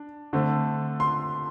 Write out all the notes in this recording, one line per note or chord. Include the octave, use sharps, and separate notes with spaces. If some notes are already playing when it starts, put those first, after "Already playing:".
Already playing: D4
D3 A3 C4
C6